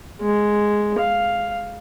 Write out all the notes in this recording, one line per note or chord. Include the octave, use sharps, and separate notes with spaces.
G#3
F5